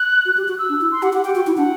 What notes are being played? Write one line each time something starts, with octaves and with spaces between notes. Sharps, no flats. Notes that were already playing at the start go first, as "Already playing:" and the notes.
Already playing: F#6
F#4
G4
F#4
F#6
E6
D4
E4
C6
G4 F#5
G4 F#5
G4 G5
F#4
E4
D4 F#5